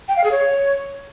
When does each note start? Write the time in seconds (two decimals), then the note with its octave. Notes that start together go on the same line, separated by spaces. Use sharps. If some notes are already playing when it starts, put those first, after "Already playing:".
0.08 G5
0.16 F5
0.23 G#4
0.31 C#5